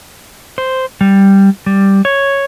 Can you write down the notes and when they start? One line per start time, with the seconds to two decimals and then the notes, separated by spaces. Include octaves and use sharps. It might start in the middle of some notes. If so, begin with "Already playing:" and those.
0.58 C5
1.01 G3
1.66 G3
2.05 C#5